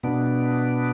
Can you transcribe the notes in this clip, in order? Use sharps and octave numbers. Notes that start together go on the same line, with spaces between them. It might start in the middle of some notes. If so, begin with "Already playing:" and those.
B2 B3 D4